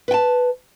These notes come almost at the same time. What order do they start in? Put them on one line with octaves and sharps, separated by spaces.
B4 G5 A5